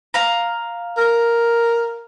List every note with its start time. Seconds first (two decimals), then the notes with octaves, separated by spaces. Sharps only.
0.14 F5 A#5
0.98 A#4